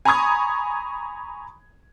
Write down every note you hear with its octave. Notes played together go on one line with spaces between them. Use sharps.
G#5 A#5 B5 C#6 D#6 G#6